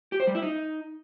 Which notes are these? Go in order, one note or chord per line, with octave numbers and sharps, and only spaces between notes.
G4
C5
G3
E4
D#4